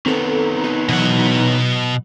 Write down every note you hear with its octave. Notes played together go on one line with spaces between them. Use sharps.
D#3 B3 C4 A4
D#4
B2 E3 F#3 F#5